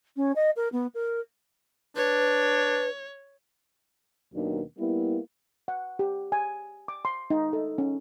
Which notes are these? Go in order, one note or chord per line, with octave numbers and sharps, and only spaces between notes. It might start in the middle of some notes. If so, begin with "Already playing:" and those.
C#4
D#5
A#4
B3
A#4
D4 B4 C#5
D#2 B2 D#3 F#3 A#3 D4
G3 A#3 B3 E4
F#5
G4
G#5
D6
C6
D#4
A4
C#4